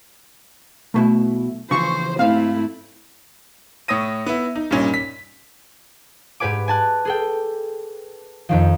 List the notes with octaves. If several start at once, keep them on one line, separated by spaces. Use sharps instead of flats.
B1 B2 A3 E4
C#3 E3 F3 C5 C#6
G#2 A3 C4 E4 F5
A2 C#5 D#6 A#6 D#7
B3 E4
D#4
G2 A#2 C#4 D#4
B6
G#2 G4 B4 G#5 D6
G#5 A5 F#6
G#4 A4 G5
F2 D#3 F3